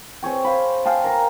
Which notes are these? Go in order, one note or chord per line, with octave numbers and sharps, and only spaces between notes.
C4 G#4 C#5 G5
C5 F5 B5
G#4 F5 G5 A5
A#4 A#5